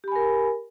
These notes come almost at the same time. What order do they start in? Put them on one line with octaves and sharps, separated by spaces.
G4 B5 G#5 A#4